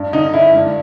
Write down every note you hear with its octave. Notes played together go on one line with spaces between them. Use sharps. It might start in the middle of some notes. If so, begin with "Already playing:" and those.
Already playing: G2
D3 D#4
D3 E4
G2